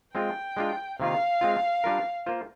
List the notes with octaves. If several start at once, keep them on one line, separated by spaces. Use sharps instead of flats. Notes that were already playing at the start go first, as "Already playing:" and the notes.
G#3 C4 F4 G5
G#3 D4 F4
C3 D#3 A#3 F4 F5
G#3 C4 F4
G3 D4 F4 A#4
A#3 F4 C5